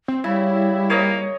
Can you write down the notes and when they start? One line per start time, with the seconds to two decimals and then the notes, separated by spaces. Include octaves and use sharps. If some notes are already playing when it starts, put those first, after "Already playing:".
0.08 C4
0.24 C#3 G3 E4
0.90 A#3 C#5 D#5